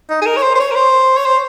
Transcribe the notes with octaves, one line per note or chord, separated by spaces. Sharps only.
D#4
G#4
A#4
C#5
C5
C5
C#5
A#4
C5
C#5
C5